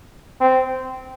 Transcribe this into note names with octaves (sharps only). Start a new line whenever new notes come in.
C4